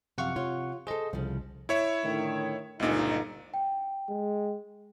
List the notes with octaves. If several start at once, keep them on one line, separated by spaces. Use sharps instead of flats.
F#2 C3 F3 F5 F#5 C#6
F4 C#5
G#4 A4 C5 D#5
C2 C#3 F3
E4 C#5 E5
A2 D3 D#3
G1 C#2 A#2 D#4
G5
G#3